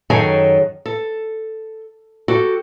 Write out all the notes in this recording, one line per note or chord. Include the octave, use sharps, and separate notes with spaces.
F#2 D#3 G#4 A4 C#5 G#5
A4
F#4 G4 A4